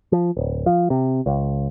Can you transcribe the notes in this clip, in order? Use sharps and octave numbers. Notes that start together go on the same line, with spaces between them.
F3
D1
F3
C3
C#2